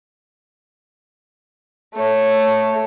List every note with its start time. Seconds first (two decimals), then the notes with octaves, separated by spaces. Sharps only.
1.95 A3 C#5